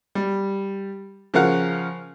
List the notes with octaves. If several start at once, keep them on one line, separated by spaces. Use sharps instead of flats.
G3
C#3 F3 A#4 F5 F#5